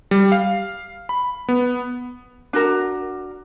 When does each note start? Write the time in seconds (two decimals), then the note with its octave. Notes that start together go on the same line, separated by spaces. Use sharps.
0.11 G3
0.32 F5
1.09 B5
1.48 B3
2.53 D4 F#4 A#4